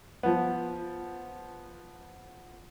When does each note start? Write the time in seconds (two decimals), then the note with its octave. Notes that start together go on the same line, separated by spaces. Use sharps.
0.23 F3 B3